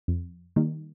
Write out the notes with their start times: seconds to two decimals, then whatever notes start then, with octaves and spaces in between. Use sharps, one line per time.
0.08 F2
0.56 D#3 G3 A#3 D#4